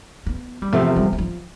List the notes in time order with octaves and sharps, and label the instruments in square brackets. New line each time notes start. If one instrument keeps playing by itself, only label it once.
[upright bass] B3
G3
[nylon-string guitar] E2 C3 F3 [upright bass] A3
[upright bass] G3
G3
F3